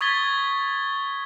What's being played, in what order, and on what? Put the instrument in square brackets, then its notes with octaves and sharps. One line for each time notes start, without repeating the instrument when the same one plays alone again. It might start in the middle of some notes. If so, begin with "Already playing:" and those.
[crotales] C#6 D#6 G#6 A6 B6 G7